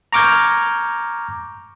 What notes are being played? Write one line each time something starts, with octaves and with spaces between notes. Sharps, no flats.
A#5 C#6 D6 F6 G6 G#6